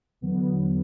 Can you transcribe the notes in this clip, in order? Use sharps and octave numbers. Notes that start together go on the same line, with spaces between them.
E2 D3 F#3 B3